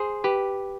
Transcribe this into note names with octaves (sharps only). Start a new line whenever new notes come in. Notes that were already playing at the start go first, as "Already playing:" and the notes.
Already playing: G#4 C5
G4 B4